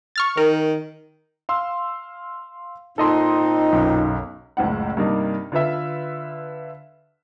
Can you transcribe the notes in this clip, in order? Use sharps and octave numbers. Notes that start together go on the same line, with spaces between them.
C#6 F6 A6
D#3 A#4
F5 C6 E6
A#2 C4 D#4 A4 D#5 C6
B1 F#2
F#1 C#2 A2 F#5
G2 C3 G3 A#3 D4 D#4
D3 F4 B4 E5